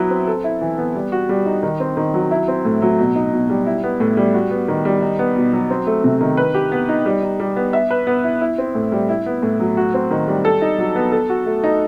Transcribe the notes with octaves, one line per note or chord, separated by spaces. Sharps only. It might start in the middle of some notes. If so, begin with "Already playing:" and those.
Already playing: F#3 B3 E4 B4
C4
A4
E4
E3
B3
G3
F#4
G3
D#4
D#3
C4
D#3
F#3
E4
C4
A2
F#3
B2
D#4
B2
G3
E4
B3
A2
G3
F#4
B3
D#3
G3
D#4
B3
B2
F#3
C4
A3
C3
D#3
B4
G4
B3
D#4
G3
D#4
G3
B3
E5
B4
B3
E4
E4
C4
A2
G3
E4
B3
A2
F#3
F#4
C4
D#3
G3
A4
D#4
F#3
B3
A4
F#4
A3
D#4